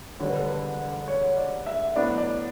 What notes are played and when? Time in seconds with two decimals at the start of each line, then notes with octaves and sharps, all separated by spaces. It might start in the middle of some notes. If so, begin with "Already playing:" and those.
0.20 E1 D2 D3 G3 C#5
0.28 B4
0.36 A4
0.45 B4
1.08 C#5
1.37 D5
1.66 E5
1.95 A2 F#3 B3 D4 D5
2.18 D5